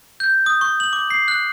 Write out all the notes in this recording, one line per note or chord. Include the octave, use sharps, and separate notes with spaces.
G6
D#6
C#6
F#7
D6
C7
F#6